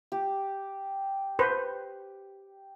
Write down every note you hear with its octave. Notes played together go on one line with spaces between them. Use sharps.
G4
B4 C5